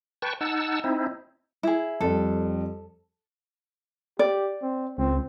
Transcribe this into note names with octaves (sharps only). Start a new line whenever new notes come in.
B4 G5 A5 C#6
D#4 F#5 A5 E6
C4 D#4 E4
E4 G#4
F2 G3 A4
G4 D5
C4
C#2 C4